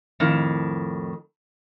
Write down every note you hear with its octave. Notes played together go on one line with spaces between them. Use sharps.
F2 A2 D#3